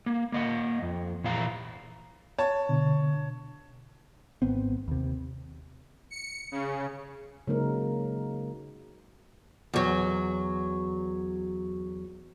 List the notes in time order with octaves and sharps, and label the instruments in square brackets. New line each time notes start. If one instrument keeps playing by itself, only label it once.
[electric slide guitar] A#3
A#3 D#5 F#5
F2
A#2 E3 F5 A#5
[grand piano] C#5 A5
[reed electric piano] B2 D3
[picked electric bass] G#1 B3 C4
D#2 C3
[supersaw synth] C#7
C#3
[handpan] C#3 F#3 G#3 A#3 D#4 A#4
[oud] E2 F#3